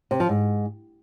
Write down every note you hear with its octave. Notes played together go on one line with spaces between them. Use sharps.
C3
F3
G#2